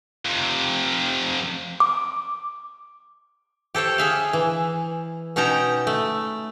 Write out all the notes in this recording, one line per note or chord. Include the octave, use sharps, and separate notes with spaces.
F2 C3
D6
G4 A4 C5 C#5
G#4 E5 F5
E3
B2 C#4 D#4 G5 A5 A#5
A3